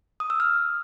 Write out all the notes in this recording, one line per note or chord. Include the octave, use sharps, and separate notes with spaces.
D#6
E6
F6